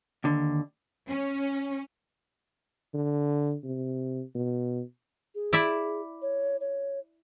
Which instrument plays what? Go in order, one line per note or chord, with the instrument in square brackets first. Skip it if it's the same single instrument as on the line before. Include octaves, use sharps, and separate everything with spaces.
[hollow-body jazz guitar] D#2 D3
[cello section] C#4
[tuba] D3
C3
B2
[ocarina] G#4
[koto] E4 D5 E5
[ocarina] C#5
C#5